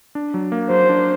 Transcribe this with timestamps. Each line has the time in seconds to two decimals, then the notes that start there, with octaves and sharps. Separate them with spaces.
0.15 D4
0.34 F#3
0.52 A#3
0.70 F#3 C5
0.89 D4